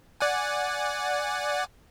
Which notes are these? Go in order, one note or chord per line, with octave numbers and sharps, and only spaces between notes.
D5 F#5 G#5